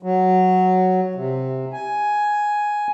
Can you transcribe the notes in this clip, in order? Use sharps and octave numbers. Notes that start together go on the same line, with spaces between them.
F#3
C3
G#5